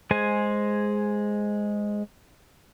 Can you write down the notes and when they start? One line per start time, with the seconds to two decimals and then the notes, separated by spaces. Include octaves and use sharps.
0.11 G#3 G#4 C5 G#5